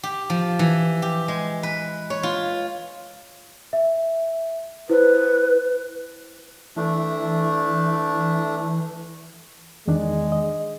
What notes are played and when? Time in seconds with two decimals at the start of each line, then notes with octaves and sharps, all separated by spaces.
0.03 G4
0.30 F3
0.59 E3
1.02 G4
1.28 G#3
1.63 B4
2.10 C#5
2.23 F4
3.73 E5
4.89 E4 B4 C5
6.76 E3 A3 D4
9.87 E2 D#3 G#3 D4
10.32 D#5